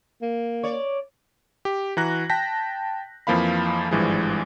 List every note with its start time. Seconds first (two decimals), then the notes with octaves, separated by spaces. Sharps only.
0.22 A#3
0.63 C#5 D5
1.65 G4
1.97 E3 F#4 A#5 F#6 A#6
2.30 G5 A5 G6 A#6 B6
3.27 F2 E3 F3 A#3 F5 B5
3.91 G#1 G2 E3 F3 G#3